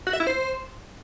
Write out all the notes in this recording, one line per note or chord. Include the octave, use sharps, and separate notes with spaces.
F#4
E5
E4
C5